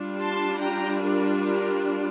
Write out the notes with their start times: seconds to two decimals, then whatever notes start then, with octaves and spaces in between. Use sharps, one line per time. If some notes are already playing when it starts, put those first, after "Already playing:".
Already playing: G3 D4 F4
0.20 A5 C6
0.60 G5 A#5
1.02 A#4 D5
1.43 G4 A#4